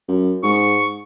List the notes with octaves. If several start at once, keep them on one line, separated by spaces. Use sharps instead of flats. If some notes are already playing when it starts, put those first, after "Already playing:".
F#2
G#2 C#6